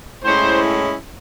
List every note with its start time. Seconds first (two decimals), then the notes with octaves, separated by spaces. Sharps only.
0.24 A2 G#3 C#4 E4 C5